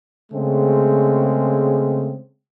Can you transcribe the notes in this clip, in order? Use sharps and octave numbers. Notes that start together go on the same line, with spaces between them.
C#3 G#3 A3 C4